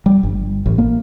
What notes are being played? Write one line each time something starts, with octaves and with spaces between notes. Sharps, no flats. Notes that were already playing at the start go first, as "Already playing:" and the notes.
G3
G1
A1
A#3